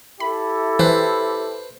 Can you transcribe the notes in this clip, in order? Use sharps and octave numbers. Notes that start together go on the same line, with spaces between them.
E4 G4 A4 B5
E3 B4 C5